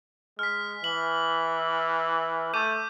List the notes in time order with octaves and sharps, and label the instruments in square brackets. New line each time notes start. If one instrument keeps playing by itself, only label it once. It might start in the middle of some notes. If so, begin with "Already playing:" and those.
[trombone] G#3 [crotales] F6 B6
[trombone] E3 [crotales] F#7
[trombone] A3 [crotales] D6 G6 D#7